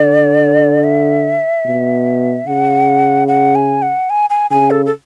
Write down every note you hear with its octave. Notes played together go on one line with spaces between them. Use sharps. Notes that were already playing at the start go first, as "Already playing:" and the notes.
Already playing: D3 D5
E5
B2
C#3 F#5
F#5
G#5
F#5
G#5
G#5
C#3 G#5
A4
A4